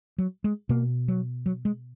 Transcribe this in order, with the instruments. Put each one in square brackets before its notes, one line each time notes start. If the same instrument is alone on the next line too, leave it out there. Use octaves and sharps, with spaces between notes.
[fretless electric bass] F#3
G#3
B2 A#3
F#3
F#3
G#3